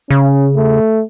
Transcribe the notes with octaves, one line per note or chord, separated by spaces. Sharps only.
C#3 C#4
A3